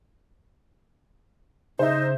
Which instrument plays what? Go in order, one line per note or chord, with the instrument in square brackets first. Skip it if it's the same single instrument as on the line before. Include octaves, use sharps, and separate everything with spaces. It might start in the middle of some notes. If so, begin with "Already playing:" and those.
[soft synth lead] C#3 [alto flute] D#4 [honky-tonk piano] C5 E5